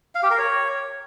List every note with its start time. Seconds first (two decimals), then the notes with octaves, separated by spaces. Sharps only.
0.15 F5
0.23 G4
0.30 A#4
0.38 C#5